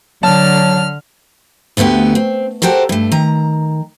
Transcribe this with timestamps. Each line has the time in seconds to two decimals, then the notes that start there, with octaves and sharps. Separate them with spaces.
0.23 D3 F#3 A5 F6
1.77 D2 D3 A3 B3 G4
2.15 C4
2.62 F#4 G4 A4 A#4 C5
2.89 G2 A3
3.12 D#3 A#5